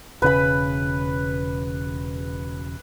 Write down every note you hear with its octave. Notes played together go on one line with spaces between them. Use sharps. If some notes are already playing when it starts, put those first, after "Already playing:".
E1 C#3 B4 B5